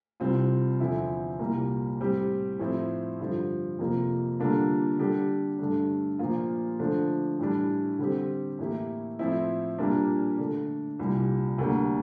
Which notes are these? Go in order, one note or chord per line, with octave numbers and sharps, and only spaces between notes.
C2 C3 G3 C4 F4
E2 D3 F3 C4 E4
C2 A#2 G3 A#3
A2 G3 C4 G4
A2 F3 C4 E4
G2 D3 F3
F2 C3 F3 A#3
D3 G3 A#3 D4 F4
D3 G3 D4 G4
G2 D3 A3 D4
A#2 F3 A#3 F4
D3 F3 A3 D4
A2 E3 G3 D4
D3 G3 C4 G4
A2 E3 A#3 E4 G4
A2 F3 C4 E4
A#2 G3 A#3 D4
D3 A3 D4
C2 A#2 G3
D2 D3 G3 A#3 D4